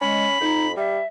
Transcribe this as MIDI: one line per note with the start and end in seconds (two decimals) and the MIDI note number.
0.01 0.25 56
0.01 0.40 61
0.01 0.72 83
0.41 0.76 41
0.41 0.66 63
0.77 1.00 55
0.77 1.06 76